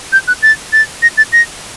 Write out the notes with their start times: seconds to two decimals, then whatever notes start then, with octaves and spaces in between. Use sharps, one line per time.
0.12 G6
0.28 F#6
0.43 A6
0.73 A6
1.02 A#6
1.17 A6
1.32 A#6